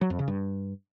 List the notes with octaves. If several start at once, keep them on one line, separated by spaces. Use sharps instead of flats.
F#3
F2
C#3
G2